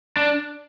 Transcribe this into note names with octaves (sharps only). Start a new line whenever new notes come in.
D4